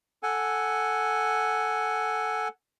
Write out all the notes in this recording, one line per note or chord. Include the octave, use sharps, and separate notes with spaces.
A4 F#5 G#5